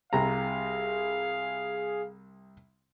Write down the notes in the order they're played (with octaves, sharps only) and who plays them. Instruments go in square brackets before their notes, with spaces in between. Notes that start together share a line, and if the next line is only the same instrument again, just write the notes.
[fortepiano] C2 C3 A#5 [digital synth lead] G#4 [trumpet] F5